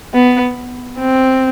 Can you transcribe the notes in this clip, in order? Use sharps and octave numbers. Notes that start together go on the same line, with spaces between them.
B3
C4